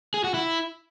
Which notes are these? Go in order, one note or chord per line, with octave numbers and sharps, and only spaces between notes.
G#4
F#4
E4